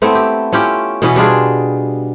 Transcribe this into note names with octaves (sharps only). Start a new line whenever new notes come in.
A3 B3 C4 E4
G4
C#4 E4 F4 G4
B2 E3 B3 C#4
G3 D4 F4 G#4